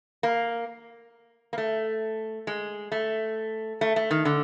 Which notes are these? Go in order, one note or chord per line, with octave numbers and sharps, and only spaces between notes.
A#3
A#3
A3
G#3
A3
A3
A3
D#3
D3